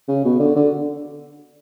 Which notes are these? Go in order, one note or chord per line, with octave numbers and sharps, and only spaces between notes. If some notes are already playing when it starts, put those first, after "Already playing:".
C#3
B2
D3
D3